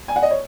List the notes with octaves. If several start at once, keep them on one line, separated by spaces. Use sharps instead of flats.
G#5
F#5
D#5
C#5